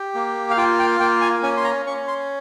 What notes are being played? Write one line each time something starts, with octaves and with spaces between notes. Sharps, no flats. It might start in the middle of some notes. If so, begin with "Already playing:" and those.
Already playing: G4
A#3
F5
F4 G5
G5
A#3 G5
G#5
C#4 G#5
C6
A#5
C#4 C#6
C6